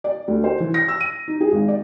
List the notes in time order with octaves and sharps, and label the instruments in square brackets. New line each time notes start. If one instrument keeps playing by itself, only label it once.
[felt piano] D5
D2
C5
E3
A#6
E6
D#7
D#4
G#4
G#1
D5